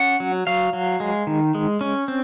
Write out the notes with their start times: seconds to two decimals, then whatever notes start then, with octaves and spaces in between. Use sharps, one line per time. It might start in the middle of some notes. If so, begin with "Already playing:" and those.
Already playing: C#4 F#5
0.20 F#3
0.47 F#3 F5
0.73 F#3
1.00 G#3
1.27 D#3
1.55 G#3
1.81 C#4
2.08 C4